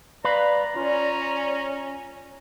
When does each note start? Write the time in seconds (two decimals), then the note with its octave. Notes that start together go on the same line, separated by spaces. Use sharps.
0.24 B4 D5 F5 A#5 B5
0.76 C#4 F4